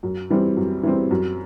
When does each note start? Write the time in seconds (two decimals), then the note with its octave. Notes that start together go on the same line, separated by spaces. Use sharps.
0.03 F#2
0.30 E3 G3 C4
0.57 F#2
0.83 E3 G3 C4
1.11 F#2